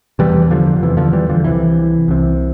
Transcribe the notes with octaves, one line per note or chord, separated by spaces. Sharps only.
E2 C3 E3 G3
D3 F3
E2 C3 E3
D3 F3
E3 G3
D3 F3
C2 C3 E3
C2 C3